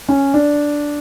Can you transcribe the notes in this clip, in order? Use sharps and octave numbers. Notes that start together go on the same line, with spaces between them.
C#4
D4